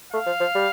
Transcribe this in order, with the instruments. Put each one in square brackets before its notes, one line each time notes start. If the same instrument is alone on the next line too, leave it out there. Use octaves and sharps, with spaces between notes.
[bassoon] A3 [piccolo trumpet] F5
[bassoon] F3
F3
G3